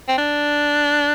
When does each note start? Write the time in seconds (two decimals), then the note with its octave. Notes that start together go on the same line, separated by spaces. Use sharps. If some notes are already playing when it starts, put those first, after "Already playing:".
0.09 C4
0.18 D4